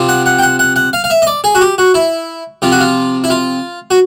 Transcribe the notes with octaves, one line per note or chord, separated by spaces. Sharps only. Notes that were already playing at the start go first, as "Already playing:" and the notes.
Already playing: C3 F3
F#5
F#5
G5
F#5
F#5
F#5
F5
F5
E5
D#5
D5
G#4
F#4
G4
F#4
E4
C3 F3 F4
F#4
F4
E4
F4
F#4